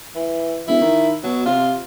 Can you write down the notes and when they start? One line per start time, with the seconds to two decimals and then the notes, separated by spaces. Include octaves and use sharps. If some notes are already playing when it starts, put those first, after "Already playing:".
0.15 E3
0.67 E1 E4
0.81 D#3
1.24 B2 F#3
1.46 C3 F4